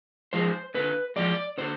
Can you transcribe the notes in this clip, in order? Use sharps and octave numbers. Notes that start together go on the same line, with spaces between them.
F3 G#3 C5
D3 B4
F3 G#3 D5
D3 C5